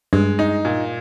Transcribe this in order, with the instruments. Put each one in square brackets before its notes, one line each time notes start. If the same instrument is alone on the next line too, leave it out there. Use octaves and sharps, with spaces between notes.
[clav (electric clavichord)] G2 [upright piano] G#3
[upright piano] D#4
A#2